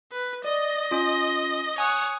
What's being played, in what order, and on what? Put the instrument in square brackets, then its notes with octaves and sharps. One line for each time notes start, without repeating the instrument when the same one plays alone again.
[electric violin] B4
[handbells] D5 [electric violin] D#5
[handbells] C#4 F4
[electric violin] C#5 F#5 [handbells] G#5 D#6